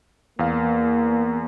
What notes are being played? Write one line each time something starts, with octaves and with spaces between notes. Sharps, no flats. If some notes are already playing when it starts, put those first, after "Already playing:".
E2 A#3 F5